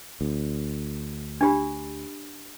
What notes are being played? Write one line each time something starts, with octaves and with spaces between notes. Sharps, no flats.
D2
D4 G4 B5